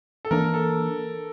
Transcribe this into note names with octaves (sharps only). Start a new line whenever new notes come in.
A4
E3 A#3 D4 A#4
A4